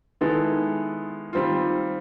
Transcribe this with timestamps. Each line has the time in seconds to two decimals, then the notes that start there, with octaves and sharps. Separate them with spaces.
0.21 D#3 G#3 B3 E4 A4
1.33 D#3 G3 C4 F4